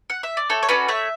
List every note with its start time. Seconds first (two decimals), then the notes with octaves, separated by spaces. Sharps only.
0.10 F#5
0.23 E5
0.37 D5
0.50 A3 A4 C#5
0.63 C#5
0.69 C#4 F#4 A4 B4 D5
0.88 A3 C#5 E5